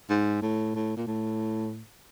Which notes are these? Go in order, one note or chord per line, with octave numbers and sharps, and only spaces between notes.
G#2
A2
A2
A#2
A2